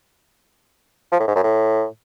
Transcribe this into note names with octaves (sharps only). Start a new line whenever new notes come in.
F3
A2
G#2
F#2
A2